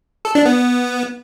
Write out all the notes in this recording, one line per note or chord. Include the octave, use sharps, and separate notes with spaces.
A4
D4
B3